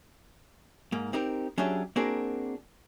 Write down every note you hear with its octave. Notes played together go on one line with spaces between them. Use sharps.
G#2 A#3
C4 D#4 G4 A#4
F#3 C#4 D4 G4 G#4 E5
A#3 C4 D4 F#4 G#4 A#4